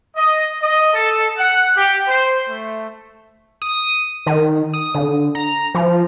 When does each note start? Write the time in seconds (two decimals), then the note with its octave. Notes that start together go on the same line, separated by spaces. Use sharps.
0.16 D#5
0.62 D#5
0.94 A4
1.38 F#5
1.77 G4
2.08 C5
2.48 A3
3.62 D#6
4.26 D#3
4.74 D#6
4.95 D3
5.35 A#5
5.74 F3